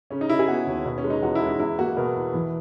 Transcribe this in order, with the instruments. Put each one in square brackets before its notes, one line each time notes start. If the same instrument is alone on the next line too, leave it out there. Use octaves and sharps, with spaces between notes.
[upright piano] C#3 C#4
D#4
C#3 E4
G#4
B3 F#4
D#2
B2
C#4
G#3
D#4
E2 F#4
E4
G#3
D#4
E2 E4
A#3 F#4
B2 A#4
E2
E3